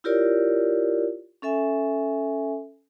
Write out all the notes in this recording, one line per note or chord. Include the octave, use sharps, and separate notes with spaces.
E4 F4 G4 A#4 C#5 D5
C#4 A4 E5 G#5